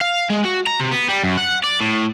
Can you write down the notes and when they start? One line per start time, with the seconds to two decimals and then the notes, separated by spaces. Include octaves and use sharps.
0.01 F5
0.30 G#3
0.45 F#4
0.67 A#5
0.80 C3
0.92 B3
1.09 G3
1.24 F#2
1.37 F#5
1.64 D5
1.81 A2